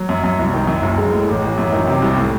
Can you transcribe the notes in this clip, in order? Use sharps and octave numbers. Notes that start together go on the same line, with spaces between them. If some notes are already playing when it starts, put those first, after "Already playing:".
Already playing: F#3
F#2
F#2
C2
D#3
F#2
F#1
G#3
A2
A1
A1
F#2
D#3
C3
C2
A2